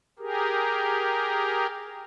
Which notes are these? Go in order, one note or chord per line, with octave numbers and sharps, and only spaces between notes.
G4 G#4 A#4